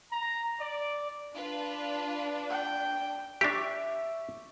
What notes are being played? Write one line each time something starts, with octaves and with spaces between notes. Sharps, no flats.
A#5
D5
D4 F4 B4
G5
D4 G4 E5 C#6 D6